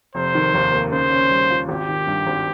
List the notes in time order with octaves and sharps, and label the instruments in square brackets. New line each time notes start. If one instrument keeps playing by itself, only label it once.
[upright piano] F1 [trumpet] C5
[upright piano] D#3
D#2
A#3
[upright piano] C#3 [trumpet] C5
[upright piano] C#4
G3
F4
[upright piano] G#1 [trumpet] G4
[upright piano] D#3
G2
G#1